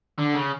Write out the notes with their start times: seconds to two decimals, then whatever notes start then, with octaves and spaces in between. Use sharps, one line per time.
0.19 D3
0.35 C#3